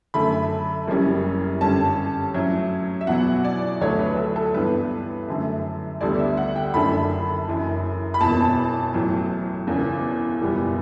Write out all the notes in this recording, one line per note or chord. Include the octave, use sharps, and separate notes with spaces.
F#2 D3 A3 B5
F#1 F#2 E3 G3 C#4
G2 D3 G3 C#4 A5
A2 F#3 C#4 E4
E5
E2 B2 F#3 B3 E4 F#5
D5
D2 D3 F#3 A3 C#5
B4
A4
A4
G2 E3 B3 D4 B4
F#2 D3 A3
D2 D3 G3 B3 D5
E5
F#5
G5
F#1 F#2 D3 A3 D4 B5
F#1 F#2 E3
B5
E1 E2 B2 A5
A1 A2 F#3
E1 E2 C#3
F#1 E2 B2 G3 B3